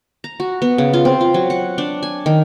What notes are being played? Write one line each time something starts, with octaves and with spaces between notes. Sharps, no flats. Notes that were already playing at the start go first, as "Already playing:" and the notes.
A#5
F#4
B3
C#3
F4
C4
F4
F#3
F#5
D4
G#5
D#3